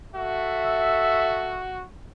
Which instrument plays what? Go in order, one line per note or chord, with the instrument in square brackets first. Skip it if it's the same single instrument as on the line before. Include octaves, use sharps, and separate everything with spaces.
[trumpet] F#4 [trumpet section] A4 E5